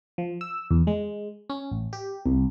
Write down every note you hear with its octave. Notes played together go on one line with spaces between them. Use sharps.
F3
E6
E2
G#3
C#4
A1
G4
C2